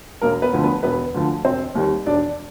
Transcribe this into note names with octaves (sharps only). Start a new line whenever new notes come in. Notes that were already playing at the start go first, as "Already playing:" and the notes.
E1 A#3 A#4
B3 B4
D2 D3 F3
B3 B4
E1 B3 B4
D2 D3 F3
E1 C4 C5
D#2 D#3 G3
E1 D4 D5